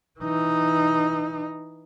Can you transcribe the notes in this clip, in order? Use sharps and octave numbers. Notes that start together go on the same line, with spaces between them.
E3 D#4